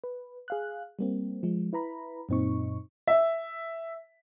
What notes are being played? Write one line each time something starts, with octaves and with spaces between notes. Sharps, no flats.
B4
G#4 F5 F#6
G3 A#3 C4
F3 G#3
E4 B4 A#5 B5
F#2 A#2 C4 D#4 C#6
E5